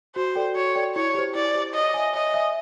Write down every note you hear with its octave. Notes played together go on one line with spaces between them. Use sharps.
F#4 C5
A4 D5 G5
F#4 C#5
A4 D5 G5
E4 C#5
G4 C5
E4 D5
G4 C5
C#5 D#5
E5 G#5
C#5 D#5
E5 G#5